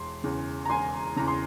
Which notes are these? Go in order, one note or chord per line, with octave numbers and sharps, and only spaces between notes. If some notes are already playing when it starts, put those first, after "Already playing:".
Already playing: E1 C6
E2 C#3
A#5
E1 G#5 C6
E2 C#3 A#5
C6